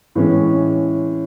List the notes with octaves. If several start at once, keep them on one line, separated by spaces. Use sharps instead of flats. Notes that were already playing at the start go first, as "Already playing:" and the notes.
A2 E3 G#3 C#4